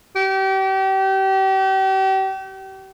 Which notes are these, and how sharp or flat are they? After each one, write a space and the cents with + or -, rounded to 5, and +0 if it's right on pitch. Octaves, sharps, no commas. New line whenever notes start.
G4 -35